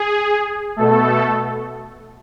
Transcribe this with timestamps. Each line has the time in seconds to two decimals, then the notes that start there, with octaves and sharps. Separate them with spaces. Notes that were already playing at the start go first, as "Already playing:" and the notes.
Already playing: G#4
0.76 B2 A3 A4